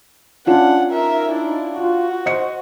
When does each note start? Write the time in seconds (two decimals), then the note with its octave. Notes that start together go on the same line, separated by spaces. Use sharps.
0.47 C#4 D4 F4 F#5
0.92 D#4 A#4 E5
1.31 D4 E4
1.77 F4 F#4
2.26 C5 D#5 C#7